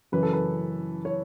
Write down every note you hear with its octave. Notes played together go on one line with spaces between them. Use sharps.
F#2 C#3 E3 B4
A4
B4
C#5